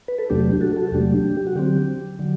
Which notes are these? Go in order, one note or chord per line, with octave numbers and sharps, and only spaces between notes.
B4
A4
E2 C3 F#3 A3 D4 G4
G4
F#4 A4
F#4 A4
E2 C3 F#3 A3 D4 G4
F#4
D3 F#3 C4 G4
D3 F#3